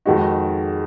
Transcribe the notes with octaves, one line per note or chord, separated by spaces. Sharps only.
F2 D#3 G#3 D#4 F#4